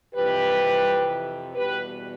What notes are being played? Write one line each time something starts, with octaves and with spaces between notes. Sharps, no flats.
F2 C3 E3 G4 B4
E2 B2 G3 G4 B4